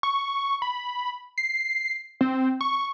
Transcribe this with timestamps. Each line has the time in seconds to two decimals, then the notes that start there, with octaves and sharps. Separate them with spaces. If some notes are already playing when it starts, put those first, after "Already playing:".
0.03 C#6
0.62 B5
1.38 C7
2.21 C4
2.61 C#6